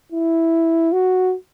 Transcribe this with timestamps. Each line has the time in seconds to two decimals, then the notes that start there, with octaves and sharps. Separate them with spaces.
0.12 E4
0.92 F#4